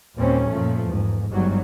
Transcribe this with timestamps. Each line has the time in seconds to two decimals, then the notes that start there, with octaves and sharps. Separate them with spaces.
0.17 D#2 A#2 G3 C4 C#4
0.49 F#2 A#2 F3 A3
0.86 E2 G#2
1.31 G1 G#2 F#3 G3